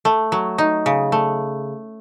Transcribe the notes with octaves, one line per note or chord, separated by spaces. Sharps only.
A3
F#3
D#4
C#3
A3